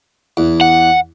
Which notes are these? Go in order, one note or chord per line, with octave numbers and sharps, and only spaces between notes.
E2
F#5